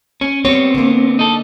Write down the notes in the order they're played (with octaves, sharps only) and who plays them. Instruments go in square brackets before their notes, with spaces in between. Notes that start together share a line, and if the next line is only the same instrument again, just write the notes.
[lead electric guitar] C#4 [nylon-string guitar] C#5
[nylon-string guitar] G3 C#5 [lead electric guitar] B3 C4
[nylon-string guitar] D3 A#3
[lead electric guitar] D#4 A4